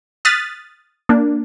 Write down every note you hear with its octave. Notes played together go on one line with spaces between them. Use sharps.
D#6 F6 F#6 A6 B6
A#3 D4